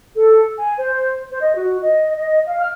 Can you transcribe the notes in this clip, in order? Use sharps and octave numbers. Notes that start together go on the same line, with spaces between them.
A4
G#5
C5
C5
D#5
F#4
D#5
D#5
F5
F6